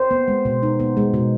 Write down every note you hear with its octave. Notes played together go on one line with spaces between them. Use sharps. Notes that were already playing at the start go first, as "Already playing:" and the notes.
Already playing: C5
B3
G#3
B2
D#4
B3
G#3
B2